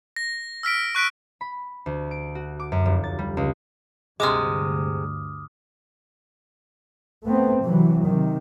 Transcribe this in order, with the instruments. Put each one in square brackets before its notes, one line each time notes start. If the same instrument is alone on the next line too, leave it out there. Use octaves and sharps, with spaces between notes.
[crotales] A#6
E6 F6 B6 D7
C#6 F#6 B6 D7
[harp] B5
D2
D7
F#4
D6
F#2
F1
A6
G3
C#2
[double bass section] D2 G2 [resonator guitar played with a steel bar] C3 G#3 [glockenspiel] D6 D#6 F6
[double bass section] A3 B3 C4
C3 E3 F#3
C3 D#3